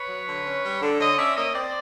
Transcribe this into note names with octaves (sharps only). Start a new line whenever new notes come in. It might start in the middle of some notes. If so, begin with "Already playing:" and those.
Already playing: B4 C#5
F#3
D3
C#4
G3
D3
D3 C#5 D#5
C#4 D5 E5
A#3 C#5 D#5
C4 C5 D5